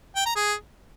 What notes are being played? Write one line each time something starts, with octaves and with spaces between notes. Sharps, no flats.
G5
A#5
G#4